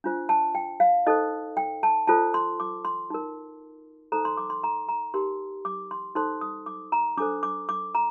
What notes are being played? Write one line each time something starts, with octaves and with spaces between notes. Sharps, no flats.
D4 F4 C5
A5
G5
F5
D#4 A4 C5 D#5
G5
A5
F4 A4 C5 A5
C6
D6
C6
D#4 A#4
D#4 A4 C5 A#5
C6
D6
C6
A#5
A#5
D#4 G4 A#4 C6
D6
C6
D#4 A4 C5 C6
D#6
D6
A#5
D4 A4 C5 D6
D6
D6
A#5